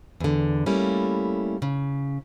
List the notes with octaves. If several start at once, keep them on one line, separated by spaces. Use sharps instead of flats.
E2 D3
G3 A3 A#3 C#4 E4
C#3